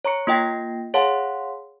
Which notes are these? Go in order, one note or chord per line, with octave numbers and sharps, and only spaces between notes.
C#5 A#5 C#6 C#7
A#3 F4 D#5 G5 A#6
G#4 C#5 F5 F#5 A5 C6